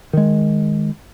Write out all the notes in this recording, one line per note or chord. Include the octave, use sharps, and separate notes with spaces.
D#3 G#3